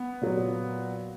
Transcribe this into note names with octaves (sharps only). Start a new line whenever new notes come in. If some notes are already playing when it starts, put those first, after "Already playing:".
Already playing: B3
A#2 F#3